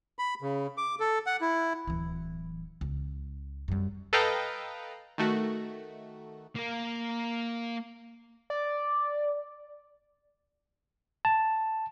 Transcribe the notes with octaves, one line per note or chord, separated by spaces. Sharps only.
B5
C#3
D6
A4
F#5
E4
D1 E3
C#2
F#2 G3
A4 B4 D#5 F5 G5 A#5
D#3 A3 F#4
A#3 A#4
D5
A5